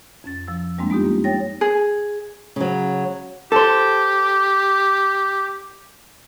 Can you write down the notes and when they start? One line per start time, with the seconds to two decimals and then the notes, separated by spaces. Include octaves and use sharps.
0.24 F2 C#4 A6
0.48 F3 E6
0.78 F#2 G3 G#3 A#3 C4 D4
0.90 G#3 B3 C4 D#4 F4 G4
1.04 G3 A#3
1.24 C#5 G5 A6 A#6
1.61 G#4
2.56 C#3 F#3
3.52 G4 A4 C5